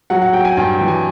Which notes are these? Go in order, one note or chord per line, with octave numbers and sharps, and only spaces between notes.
F#3 F#5
F#5
F#3 G5
G#5
G2 G5
G5
E3
G#5